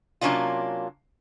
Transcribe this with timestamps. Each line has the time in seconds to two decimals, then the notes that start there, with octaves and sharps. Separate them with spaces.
0.21 C3 F#3 A#3 C#4 D4 F4